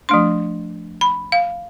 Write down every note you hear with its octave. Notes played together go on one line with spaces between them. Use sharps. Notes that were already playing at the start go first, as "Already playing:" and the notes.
F3 A3 D4 C6
B5
F5